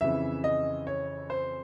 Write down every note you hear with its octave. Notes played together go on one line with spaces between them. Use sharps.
F2 C#3 E3 E5
D#5
C#5
C5